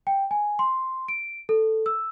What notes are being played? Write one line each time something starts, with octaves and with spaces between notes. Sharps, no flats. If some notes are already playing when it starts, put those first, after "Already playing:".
G5
G#5
C6
D7
A4
E6